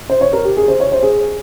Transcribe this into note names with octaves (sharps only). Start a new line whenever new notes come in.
C5
C#5
A#4
G4
G#4
C5
C#5
C5
G#4